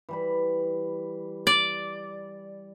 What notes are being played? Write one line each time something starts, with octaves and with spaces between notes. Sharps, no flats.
E3 G3 B5
D5